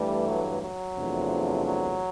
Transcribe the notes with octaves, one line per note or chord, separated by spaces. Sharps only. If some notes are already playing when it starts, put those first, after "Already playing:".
Already playing: G2 E3 G3 A3
F#3
F#3
E2 C3 F3 A3 D4
F#3